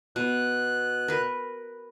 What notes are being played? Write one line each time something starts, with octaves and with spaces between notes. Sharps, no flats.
B2 F#6
A#4 B4